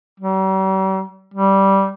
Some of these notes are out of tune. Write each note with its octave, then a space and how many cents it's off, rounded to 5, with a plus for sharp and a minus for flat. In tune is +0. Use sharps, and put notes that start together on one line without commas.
G3 -45
G3 -10